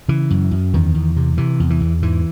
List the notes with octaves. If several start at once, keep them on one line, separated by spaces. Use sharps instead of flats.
C#3 E3
F#2
F#2
E2 D#3
E2
C3
C3 E3
E2
E3
E2
G#2 E3